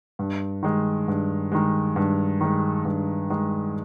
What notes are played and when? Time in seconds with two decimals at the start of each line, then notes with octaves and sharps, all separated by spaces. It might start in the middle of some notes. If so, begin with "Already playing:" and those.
0.19 G2
0.63 D#3 G#3
1.08 G2
1.52 D#3 G#3
1.96 G2
2.41 D#3 G#3
2.85 G2
3.30 D#3 G#3